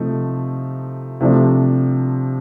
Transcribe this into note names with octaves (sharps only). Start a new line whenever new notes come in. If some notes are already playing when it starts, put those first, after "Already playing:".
Already playing: C3 F3 A3 D#4
C3 F3 A3 D4